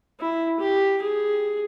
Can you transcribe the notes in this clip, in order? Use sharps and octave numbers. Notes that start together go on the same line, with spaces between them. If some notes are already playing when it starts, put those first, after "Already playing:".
E4
G4
G#4